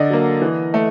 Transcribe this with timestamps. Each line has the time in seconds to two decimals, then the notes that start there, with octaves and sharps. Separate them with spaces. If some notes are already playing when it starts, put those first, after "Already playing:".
Already playing: D3 D5 D#5
0.10 F#3 A#3
0.42 E3
0.74 A3